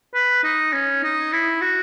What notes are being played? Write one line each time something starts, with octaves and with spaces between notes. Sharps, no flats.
B4
D#4
C#4
D#4
E4
F#4